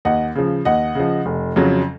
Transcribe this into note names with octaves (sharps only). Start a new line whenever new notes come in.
D#2 D#5 F#5
C#3 F3
D#2 D#5 F#5
C#3 F3
F1
F2 C#3 F#3